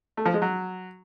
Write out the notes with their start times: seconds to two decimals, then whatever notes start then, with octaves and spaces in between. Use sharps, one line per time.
0.17 A3
0.25 F3
0.34 G#3
0.42 F#3